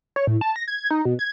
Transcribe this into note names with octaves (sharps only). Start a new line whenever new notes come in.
C#5
A2
A5
A#6
G#6
D#4
B2
G#6